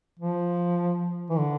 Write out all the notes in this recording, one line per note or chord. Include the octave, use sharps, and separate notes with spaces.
F3
E3
D3